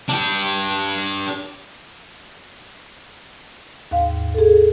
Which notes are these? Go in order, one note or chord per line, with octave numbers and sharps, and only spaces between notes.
D4 G4
D#2 G#2 F5
G#4 A4